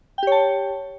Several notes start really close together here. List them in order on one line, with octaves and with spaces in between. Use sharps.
G5 G4 C#5 A5